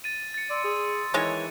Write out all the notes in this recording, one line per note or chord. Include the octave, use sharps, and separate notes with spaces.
A6 D#7
A6 C#7
D5 C6 E6
G#4
D#3 E3 G#3 C#5